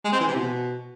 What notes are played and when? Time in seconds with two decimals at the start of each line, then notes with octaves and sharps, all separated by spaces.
0.05 G#3
0.12 C4
0.20 E3
0.28 C3
0.36 B2